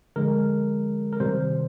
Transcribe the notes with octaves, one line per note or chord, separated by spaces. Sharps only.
D3 F3 G#3 A#4
A#4
C3 D#3 G3 C5